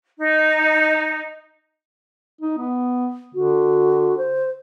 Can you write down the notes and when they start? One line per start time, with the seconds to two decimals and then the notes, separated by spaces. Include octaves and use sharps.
0.19 D#4
2.41 D#4
2.58 B3
3.35 D3 F#4
4.18 C5